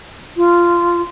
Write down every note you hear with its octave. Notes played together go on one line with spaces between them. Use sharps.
F4